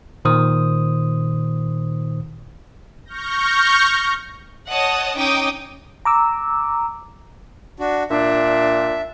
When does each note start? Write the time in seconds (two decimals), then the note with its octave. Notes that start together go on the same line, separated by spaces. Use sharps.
0.25 A#2 D#3 C5 D#6
3.05 C#6 F6 G6 A#6
4.69 C#5 D#5 F#5 A5 D#6
5.17 C#4 D#4 G5 D6 D#6
6.05 A#5 D6 E6
7.79 D4 F#4
8.10 A#2 D4 E5